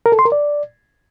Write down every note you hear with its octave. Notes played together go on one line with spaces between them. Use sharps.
A#4
A4
C6
A#4
D5